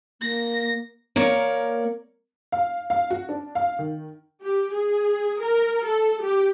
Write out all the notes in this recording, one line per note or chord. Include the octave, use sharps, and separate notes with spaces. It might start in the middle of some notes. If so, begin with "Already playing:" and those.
A#3 A#6
A#3 A#4 C#5 D5
F5
F5
F#4
D4
F5
D#3
G4
G#4
A#4
A4
G4